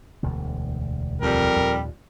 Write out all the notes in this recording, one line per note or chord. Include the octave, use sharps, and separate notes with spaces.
E1 D2
F2 G3 A#4
D#2 A#2